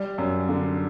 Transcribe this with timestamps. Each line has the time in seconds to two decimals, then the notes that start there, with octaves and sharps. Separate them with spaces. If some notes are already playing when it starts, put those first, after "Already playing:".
Already playing: G3
0.18 F#2
0.49 D3